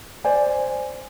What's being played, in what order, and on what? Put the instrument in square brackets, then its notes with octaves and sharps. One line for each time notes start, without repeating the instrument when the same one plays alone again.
[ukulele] C5 D5 G#5